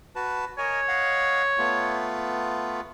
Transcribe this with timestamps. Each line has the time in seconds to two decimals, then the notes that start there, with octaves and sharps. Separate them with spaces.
0.16 F#4 B4 A5
0.58 A#4 C#5 D#5 G#5
0.88 D#5 F5 F#5
1.58 A3 B3 F4